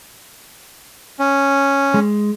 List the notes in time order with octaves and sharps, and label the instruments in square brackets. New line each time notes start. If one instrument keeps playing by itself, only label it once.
[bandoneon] C#4
[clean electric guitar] G#3